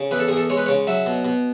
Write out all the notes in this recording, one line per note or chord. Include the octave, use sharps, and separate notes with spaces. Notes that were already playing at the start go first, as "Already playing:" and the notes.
Already playing: C#3
E2 B4
A4
E2 G#4
A4
G#3 C#5
B4
C#3 C#5
F#3 E5
B2
B2